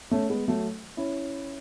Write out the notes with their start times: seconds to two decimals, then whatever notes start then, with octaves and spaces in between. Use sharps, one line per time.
0.11 A3 C#4
0.29 G#3 B3
0.48 F#3 A3
0.97 C#4 E4